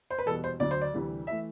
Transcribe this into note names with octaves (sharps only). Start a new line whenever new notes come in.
C5
B4
E2 B2 G3 A4
C5
D2 D3 F#3 D5
C5
D5
D2 C3 E3 G3
E3 A3 E5